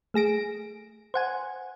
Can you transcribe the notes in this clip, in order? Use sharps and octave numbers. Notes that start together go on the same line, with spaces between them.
A3 G#4 A#6 D7
C5 F#5 G#5